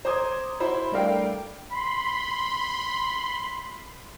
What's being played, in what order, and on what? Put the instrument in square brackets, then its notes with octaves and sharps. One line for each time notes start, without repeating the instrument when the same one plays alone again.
[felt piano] C5 A#5 D6 D#6 G#6
E4 F#4 C5 B5
G3 A3 D4 A#4 F5 G5
[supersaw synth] B5 C6